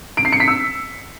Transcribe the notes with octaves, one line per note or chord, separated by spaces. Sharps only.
D7
C7
C#7
B6
E6